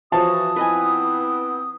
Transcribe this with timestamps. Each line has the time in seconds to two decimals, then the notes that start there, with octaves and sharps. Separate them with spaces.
0.12 E3 F3 F#4 C#5 F5 A5 D#6
0.56 B3 C4 E4 B4 D#5 G#5